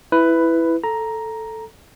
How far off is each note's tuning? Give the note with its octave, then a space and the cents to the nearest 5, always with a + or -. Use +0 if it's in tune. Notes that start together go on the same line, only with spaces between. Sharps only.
E4 +0 B4 +10
A4 +0 A#5 +5